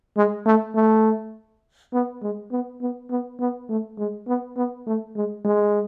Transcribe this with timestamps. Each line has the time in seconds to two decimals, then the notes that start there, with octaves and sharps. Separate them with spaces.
0.16 G#3
0.46 A3
0.75 A3
1.93 B3
2.22 G#3
2.51 B3
2.81 B3
3.10 B3
3.40 B3
3.69 A3
3.98 G#3
4.28 B3
4.57 B3
4.87 A3
5.16 G#3
5.45 G#3